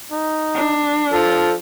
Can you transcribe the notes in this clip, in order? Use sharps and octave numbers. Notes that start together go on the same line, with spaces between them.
D#4
D4
F3 A4